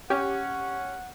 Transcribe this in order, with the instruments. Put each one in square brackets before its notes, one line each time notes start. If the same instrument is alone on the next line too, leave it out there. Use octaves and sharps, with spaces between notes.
[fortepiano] C#4 [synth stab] G4 [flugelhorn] F#5